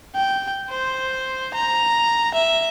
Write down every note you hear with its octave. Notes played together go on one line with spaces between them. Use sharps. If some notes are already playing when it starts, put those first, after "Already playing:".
G5
C5
A#5
E5